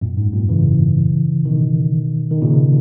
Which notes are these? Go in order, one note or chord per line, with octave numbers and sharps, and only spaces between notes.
F#2 A#2
G#2
F#2 A#2
C#3 E3
B2 D#3
D#3
A#2 C#3